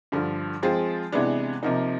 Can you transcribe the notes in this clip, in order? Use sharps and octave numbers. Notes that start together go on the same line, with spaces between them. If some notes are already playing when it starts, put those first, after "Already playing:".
G2 D3 F3
F3 G#3 C4 F4 G#4
C3 E3 G#3 B3 D4
C3 F3 A#3 D#4